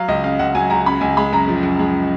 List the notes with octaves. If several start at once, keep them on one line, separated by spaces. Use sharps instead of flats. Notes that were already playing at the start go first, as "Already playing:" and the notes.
Already playing: F#3 F5
C#2 D#5
C#3 F5
C#2 F#5
F#3 G#5
C#2 A#5
C#3 B5
C#2 G#5
G#3 B5
F#2 A#5
F3
F#2
G#3